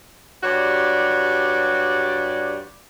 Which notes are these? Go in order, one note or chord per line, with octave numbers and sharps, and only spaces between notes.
G2 F#4 G4 C#5 D5